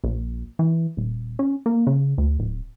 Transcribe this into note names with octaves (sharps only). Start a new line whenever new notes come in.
A#1
E3
D#1
C#4
A#3
C#3
D2
D1